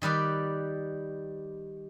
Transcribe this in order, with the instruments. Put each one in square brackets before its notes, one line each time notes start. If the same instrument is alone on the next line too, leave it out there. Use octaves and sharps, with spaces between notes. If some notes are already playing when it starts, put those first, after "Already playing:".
[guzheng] D#3 G3 B4 D5